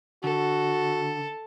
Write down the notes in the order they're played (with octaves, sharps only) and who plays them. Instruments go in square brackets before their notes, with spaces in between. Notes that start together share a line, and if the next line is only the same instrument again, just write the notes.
[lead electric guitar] D3 [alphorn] F#4 [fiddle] A4